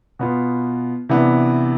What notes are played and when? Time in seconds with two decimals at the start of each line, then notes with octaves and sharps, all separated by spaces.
0.19 B2 B3 F4
1.09 C3 E3 B3 D4